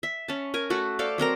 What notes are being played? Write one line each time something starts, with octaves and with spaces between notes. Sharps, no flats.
E5
C#4 A5
A#4 G#5
A3 F#4 A4
A4 C5 D5 F5
F#3 C4 A#4 A#5